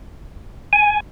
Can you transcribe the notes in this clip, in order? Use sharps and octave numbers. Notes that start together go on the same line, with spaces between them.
G#5